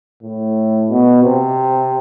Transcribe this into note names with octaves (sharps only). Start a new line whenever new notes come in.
A2
B2
C3